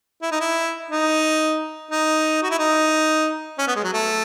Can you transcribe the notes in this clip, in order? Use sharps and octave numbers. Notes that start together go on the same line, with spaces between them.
E4
D#4
E4
D#4
D#4
F#4
E4
D#4
C#4
B3
G#3
F#3
A3